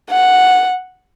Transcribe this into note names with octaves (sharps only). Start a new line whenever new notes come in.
F#5